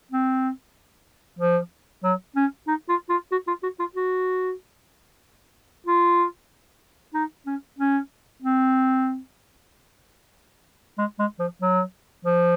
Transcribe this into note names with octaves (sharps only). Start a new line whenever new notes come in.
C4
F3
F#3
C#4
D#4
F4
F4
F#4
F4
F#4
F4
F#4
F4
D#4
C#4
C#4
C4
G#3
G#3
F3
F#3
F3